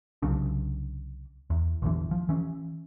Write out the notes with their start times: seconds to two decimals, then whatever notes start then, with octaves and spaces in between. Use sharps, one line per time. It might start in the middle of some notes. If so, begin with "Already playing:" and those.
0.22 C2 C#3 F#3 D4
1.50 E2
1.82 A#1 E2 D3 E3
2.11 F3
2.29 E3 C#4